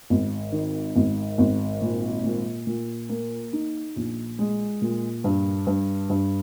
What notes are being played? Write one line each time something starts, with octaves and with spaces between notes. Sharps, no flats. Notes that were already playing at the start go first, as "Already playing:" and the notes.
G#1
D#3
G#1
G#1
A#2
A#2
A#2
A#3
D#4
A#1
G#3
A#2
G2
G2
G2